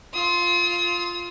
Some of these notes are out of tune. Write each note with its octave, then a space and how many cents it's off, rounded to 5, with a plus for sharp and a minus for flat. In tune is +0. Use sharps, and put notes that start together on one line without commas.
F4 +0 D#6 +40